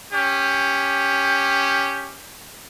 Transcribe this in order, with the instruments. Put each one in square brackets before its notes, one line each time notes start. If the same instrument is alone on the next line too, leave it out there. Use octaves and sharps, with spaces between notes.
[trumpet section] C#4 G4